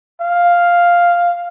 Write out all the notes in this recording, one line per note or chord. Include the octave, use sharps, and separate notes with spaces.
F5